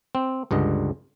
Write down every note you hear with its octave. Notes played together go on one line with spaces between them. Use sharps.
C4
C#2 G2 D3 D#5